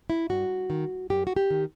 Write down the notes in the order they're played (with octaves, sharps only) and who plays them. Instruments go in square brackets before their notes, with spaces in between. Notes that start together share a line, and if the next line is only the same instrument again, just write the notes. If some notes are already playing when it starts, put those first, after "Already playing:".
[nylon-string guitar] E4
G2 F#4
D#3
F#2 G4
F#4
G4
D#3